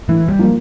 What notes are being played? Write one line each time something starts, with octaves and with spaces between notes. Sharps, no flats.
A2 E3
G3
F3 A#3 F4